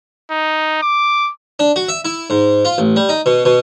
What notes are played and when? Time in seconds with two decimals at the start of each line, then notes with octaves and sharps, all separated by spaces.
0.31 D#4
0.82 D6
1.59 D4
1.76 F#4
1.88 E5
2.05 E4
2.30 G#2
2.65 F4
2.78 A1
2.96 G3
3.09 D#4
3.26 B2
3.45 B2